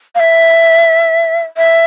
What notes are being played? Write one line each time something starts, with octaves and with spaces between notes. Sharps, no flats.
F5
E5
E5